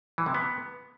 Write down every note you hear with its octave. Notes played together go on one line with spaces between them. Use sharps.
E3
C3
B3